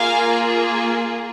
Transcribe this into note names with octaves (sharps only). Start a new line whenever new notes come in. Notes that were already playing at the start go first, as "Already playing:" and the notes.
Already playing: A#3 F4 G#4 F5 G#5